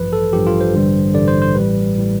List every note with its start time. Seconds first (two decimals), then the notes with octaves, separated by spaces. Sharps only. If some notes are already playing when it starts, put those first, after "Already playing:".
Already playing: A1 G2 F3 B4
0.13 A4
0.33 A1 G2 F3 G4
0.47 F4
0.61 C5
0.73 A1 G2 D3 G3
1.14 A1 G2 D3 G3 D5
1.28 C5
1.42 C5
1.55 A1 A2 G3 B4
1.98 A2 G3